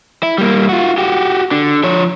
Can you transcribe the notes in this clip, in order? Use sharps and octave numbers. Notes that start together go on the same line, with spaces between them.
E4
G3 A#3
F4 F#4
F#4 G4
D3
F3 C#5